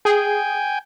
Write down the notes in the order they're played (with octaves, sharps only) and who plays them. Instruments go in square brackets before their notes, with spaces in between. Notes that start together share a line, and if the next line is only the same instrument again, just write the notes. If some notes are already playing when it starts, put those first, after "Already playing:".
[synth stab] G#4 [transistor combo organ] G5 G#5